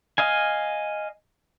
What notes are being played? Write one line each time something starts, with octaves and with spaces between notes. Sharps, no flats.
D#5 F5 G#5